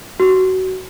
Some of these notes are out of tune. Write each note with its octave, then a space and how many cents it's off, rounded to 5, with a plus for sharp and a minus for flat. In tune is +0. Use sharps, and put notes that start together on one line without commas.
F#4 +20